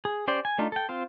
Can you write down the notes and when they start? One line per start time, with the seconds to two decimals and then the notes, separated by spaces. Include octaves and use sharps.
0.05 G#4
0.28 C#4 G4 C5 D5 G5
0.45 G#5
0.58 A3 D4 D#4 F4
0.72 A4 G5
0.89 C4 F4 C5